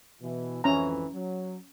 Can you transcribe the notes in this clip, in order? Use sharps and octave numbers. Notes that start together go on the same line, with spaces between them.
B2 E3
G#1 F2 E3 C#4 A#5
F#3